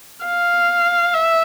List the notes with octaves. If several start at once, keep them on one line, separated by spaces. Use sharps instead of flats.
F5
E5